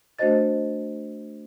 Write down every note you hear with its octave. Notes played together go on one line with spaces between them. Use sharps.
A3 D4 F#4 C5 D#5 A6